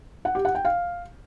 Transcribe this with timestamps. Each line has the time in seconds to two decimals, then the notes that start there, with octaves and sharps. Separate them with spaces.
0.25 F#5
0.35 G4
0.45 F#5
0.55 G5
0.65 F5